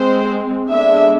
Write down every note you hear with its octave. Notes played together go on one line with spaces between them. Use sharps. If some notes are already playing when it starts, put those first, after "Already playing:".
Already playing: G#3 C4 C5
D3 G#3 B3 D4 E5